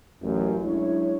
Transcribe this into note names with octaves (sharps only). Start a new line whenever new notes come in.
A1 F#2
F#3 G#3 D4 E4 C#5